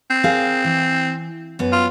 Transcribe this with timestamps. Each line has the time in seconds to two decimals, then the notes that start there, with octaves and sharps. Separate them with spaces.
0.11 C4
0.24 G#4 A#4 F5
0.64 E3
1.59 F#2 B3
1.73 F4